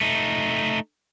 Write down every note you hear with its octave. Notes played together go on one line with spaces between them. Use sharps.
A3 D#4